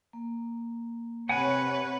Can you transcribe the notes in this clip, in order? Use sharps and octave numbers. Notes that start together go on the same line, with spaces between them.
A#3
C3 B4 C#5 F#5 G#5